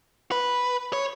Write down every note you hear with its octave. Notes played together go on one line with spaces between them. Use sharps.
B4
C#5